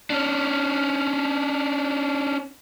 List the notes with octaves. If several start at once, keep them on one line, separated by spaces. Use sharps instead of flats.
C#4 D4